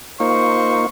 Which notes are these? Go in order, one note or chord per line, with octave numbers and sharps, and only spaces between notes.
A#3 D#4 F4 C5 C#6